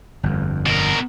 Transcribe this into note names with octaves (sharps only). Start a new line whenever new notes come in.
G1 F2
B2 A#4